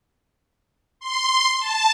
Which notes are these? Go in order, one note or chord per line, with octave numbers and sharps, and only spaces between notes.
C6
A5